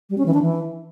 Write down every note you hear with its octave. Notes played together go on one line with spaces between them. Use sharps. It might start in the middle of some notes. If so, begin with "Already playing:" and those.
G3
C#4
E3
D4
E3